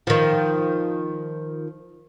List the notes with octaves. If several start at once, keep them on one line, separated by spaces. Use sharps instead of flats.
D#3 F3